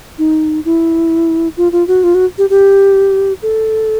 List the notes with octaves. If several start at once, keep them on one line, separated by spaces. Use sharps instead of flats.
D#4
E4
F4
F4
F#4
F4
F#4
G4
G4
A4